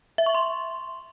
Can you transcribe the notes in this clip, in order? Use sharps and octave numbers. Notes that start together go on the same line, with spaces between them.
E5
C#6
C6